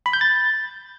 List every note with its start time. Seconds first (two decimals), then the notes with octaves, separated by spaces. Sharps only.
0.06 B5
0.13 G6
0.21 A6